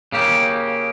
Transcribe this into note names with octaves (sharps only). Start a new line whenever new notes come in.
C#3 A#3 G4